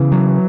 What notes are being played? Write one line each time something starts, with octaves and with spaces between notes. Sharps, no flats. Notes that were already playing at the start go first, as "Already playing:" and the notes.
Already playing: C#3 E3 B3
F#3